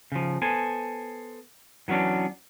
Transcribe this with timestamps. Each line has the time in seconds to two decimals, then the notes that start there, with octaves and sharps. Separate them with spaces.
0.12 C#3 F3
0.42 B3 A4 C5 G#5
1.88 E3 F#3 B3 C#4 D4